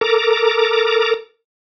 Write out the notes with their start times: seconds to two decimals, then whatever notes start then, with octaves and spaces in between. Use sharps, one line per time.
0.01 A4 A#4 A#5 D6